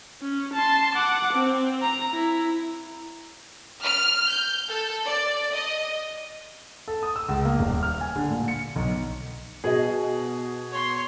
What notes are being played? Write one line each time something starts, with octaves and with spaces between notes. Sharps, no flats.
C#4
A5 C6
F#5 D6
C4
A#5
E4
F6
G6
A4
D5
D#5
A4
D#6
E6
C#2
A#3
D#1
F6
G#5
D3
A#2
C#7
B1
B2 G#4 D#5
C#5 C6